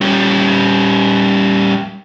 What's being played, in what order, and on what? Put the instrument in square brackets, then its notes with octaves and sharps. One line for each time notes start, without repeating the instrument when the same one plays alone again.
[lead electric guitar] G3 C#4